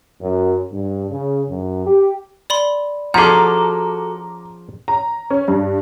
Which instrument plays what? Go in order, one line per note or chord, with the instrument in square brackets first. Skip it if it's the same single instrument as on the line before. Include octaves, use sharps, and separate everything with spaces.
[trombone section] F#2
G2
C#3
F#2
G4
[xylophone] D5 B5 C6
[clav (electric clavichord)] F3 C#4 G#4 [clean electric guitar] F#4 A4 [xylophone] F#5 [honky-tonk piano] A#5 D6
[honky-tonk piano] A#5
C#4
G2